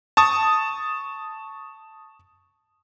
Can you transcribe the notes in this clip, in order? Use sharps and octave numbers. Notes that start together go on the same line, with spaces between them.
A5 C#6 D#6